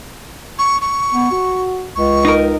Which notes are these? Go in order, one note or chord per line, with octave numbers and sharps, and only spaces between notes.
C#6
C#6
B3
F#4
C#2 C#6
D#4 A#4